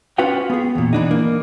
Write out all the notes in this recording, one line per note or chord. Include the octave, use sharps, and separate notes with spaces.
C#4 F4 F#4 B4 F5 G5
B3 G#4
E2 A#2
E3 D4 D#4
A#3